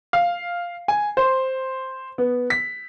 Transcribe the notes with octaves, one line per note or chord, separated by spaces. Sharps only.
F5
G#5
C5
B3
B6